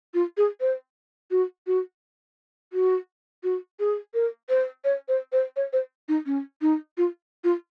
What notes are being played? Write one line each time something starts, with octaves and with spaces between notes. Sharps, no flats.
F4
G#4
C5
F#4
F#4
F#4
F#4
G#4
A#4
C5
C#5
C5
C5
C#5
C5
D#4
C#4
D#4
F4
F4